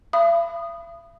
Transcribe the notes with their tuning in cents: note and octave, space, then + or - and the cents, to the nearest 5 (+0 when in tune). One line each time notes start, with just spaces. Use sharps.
E5 +45 B5 +5 D#6 -10